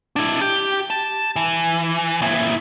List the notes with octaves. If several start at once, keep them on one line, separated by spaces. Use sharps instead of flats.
D4 E4
G4
A5
E3
A#2 E4